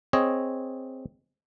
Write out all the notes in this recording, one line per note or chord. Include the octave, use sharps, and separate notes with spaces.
C4 G#4 C#5 D#5